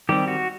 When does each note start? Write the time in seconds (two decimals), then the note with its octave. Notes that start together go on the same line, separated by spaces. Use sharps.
0.09 D#3 G3 C4 G4
0.28 F#4